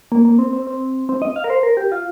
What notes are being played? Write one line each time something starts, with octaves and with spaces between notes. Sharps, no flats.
A#3
A#3
C4
C4
C4
C4
D#5
F5
A#4
C5
A#4
G4
F4